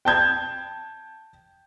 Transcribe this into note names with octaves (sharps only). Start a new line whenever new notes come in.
G5 A5 G6 G#6